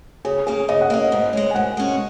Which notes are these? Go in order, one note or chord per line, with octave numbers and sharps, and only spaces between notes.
C#3 G#4
A#3 C#4 G#4
C#3 D#5
F#5
A#3 C#4 D#5
G#2
G#3 C#4
G#5
G#2 F#5
G#3 C#4